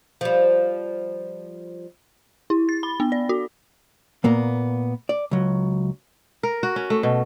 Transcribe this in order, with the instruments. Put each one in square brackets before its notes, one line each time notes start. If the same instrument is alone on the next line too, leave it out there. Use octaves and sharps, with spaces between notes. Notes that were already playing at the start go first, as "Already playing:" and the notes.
[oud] F3 G3
[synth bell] E4
A6
B5
B3
D5
F#4
[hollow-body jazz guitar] A#2 A#3 B3
D5
C#2 F#3
[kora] A#4
F#4
C#4
A3
B2